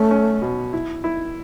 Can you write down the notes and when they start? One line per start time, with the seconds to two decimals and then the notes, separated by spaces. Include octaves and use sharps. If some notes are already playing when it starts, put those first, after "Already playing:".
Already playing: A3 C#4
0.11 C#4
0.42 B2
0.73 E4
1.04 E4